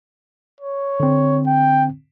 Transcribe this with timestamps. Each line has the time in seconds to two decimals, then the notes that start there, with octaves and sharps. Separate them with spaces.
0.61 C#5
1.00 D3 C4
1.46 G5